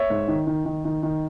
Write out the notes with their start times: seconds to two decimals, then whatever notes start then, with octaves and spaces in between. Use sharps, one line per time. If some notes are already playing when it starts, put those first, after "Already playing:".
Already playing: C#5 E5
0.10 G#2
0.28 D#3
0.47 D#3
0.65 D#3
0.85 D#3
1.03 D#3